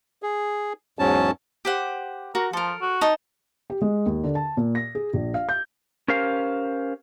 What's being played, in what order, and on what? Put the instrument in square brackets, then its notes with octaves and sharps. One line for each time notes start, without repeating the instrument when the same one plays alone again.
[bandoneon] G#4
E2 G#2 F#3 C#4 A5
[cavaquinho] G4 C5 F#5
[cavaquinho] F#4 [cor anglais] A#4
[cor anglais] F3 [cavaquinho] A4 A#4
[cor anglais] F#4
[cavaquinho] D#4 A5 D#6
[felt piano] G4
G#3
D#2
D3
A5
A#2
A#6
G#4
A#1
F5
G6
[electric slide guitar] C#4 G4 A#4 C5 F5